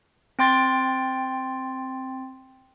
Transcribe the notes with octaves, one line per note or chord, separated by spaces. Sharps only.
C4 G5 C6 A6